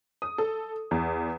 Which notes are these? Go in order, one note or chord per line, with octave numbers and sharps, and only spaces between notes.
D#6
A4
E2